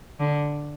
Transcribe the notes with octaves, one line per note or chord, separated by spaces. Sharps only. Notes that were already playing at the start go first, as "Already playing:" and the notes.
D3